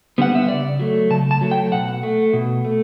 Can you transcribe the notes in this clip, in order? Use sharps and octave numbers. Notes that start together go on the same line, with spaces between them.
D3 G3 B3 F#5
E5
C#3 D5
F#3 A3
C#3 A5
A5
F#3 A3
G5
B2 F#5
A3
B2
A3